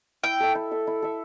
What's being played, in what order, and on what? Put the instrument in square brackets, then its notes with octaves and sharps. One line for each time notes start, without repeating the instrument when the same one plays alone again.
[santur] E4 [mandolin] G5
[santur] A4 E5
E4
A4 E5
E4
A4 E5